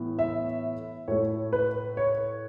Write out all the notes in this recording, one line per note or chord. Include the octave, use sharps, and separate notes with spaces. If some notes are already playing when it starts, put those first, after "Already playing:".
Already playing: A2 E3 B3
E5
A2 A3 C#5
B4
C#5